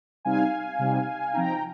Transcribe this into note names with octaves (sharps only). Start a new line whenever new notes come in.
C3 G3 C4 D#4 F5 G#5
C3 G3 C4 D#4
F3 C4 D#4 G5 A#5